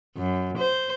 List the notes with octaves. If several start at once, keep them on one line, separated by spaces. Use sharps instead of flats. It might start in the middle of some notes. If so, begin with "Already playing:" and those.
F#2
C5